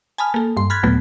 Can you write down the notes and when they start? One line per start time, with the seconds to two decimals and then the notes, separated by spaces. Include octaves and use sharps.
0.18 G#5 A5 B5 D#6 F6
0.34 A#3 A4
0.57 G2 C6
0.70 B5 F6 F#6 G#6 A6 B6
0.83 D#2 A#2 F#3 A3 B3